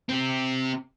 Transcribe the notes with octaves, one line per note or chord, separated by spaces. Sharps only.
C3 C4